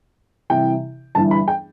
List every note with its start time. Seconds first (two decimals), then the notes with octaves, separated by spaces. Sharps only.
0.50 C2 C3 E3 G5
1.15 G1 G2 E3 A5
1.31 B5
1.48 G5